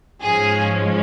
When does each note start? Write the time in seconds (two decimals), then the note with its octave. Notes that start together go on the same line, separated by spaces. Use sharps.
0.22 G#2 F3 G#3 C#4 G#4